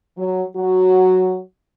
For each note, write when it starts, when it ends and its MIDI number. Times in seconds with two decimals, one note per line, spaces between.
0.18 0.45 54
0.57 1.40 54
0.57 1.40 66